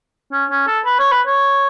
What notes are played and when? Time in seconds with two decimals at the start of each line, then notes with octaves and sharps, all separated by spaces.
0.32 C#4
0.50 C#4
0.67 A4
0.85 B4
0.99 C#5
1.12 B4
1.27 C#5